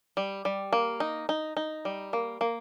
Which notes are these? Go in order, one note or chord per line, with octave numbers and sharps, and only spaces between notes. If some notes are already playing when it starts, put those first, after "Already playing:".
G3
G3
A#3
D#4
D#4
D#4
G3
A#3
A#3